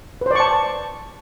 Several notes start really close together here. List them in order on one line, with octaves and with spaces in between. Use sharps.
B4 C5 D5 C#6 A5